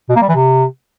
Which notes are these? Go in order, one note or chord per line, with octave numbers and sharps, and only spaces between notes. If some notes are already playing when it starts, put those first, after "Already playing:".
B2
A#3
G3
E3
C3